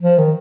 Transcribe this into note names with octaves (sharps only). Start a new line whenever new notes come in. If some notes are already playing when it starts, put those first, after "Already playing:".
F3
D#3